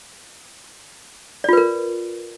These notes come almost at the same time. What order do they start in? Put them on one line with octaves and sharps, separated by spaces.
D5 F4 B4 A#4